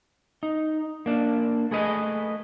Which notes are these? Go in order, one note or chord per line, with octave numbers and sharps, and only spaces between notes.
D#4
A#3 D4
A3 G#4 B4 D#5